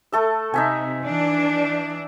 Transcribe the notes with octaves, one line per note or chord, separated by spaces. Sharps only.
A3 A4 E5
C3 D#4 E5 G#5
E3 D4